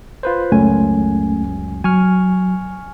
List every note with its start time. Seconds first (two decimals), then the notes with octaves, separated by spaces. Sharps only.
0.23 F4 B4 C5
0.52 C#2 F#2 A3 C#4 G#5
1.84 F#3 G#5 C#6 F6